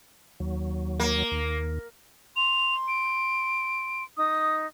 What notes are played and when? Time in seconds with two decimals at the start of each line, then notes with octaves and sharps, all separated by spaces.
0.40 D#2 F#3
1.00 A#3
1.32 D#2
2.36 C6 F7
2.88 D7
4.17 D#4 D#6